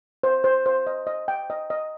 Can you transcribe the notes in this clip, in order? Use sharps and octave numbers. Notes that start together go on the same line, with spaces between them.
C5
C5
C5
D#5
D#5
G5
D#5
D#5